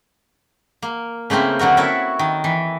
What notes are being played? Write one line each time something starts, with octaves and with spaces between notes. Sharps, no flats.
A#3
C#3 A3 A#3 C4 E4
D3 F#3 F#4 A#4
E4 F#4 A4 C#5 E5
D#3
E3